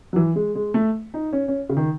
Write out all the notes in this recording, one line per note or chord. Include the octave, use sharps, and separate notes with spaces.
F#3
E3
G#3
G#3
A3
D#4
C#4
C#4
C#3
D#3